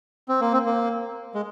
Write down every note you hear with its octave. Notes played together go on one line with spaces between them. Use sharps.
C4
A#3
C4
A#3
G#3